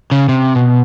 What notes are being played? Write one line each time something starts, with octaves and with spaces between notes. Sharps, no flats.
C#3
C3
B2